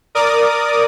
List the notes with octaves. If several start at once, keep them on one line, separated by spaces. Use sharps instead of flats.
A#4 D5 D6 D#6